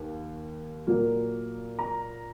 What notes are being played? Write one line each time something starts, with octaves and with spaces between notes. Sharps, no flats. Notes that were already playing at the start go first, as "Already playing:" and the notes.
Already playing: D#2
A#2 F#3 A#3
A#5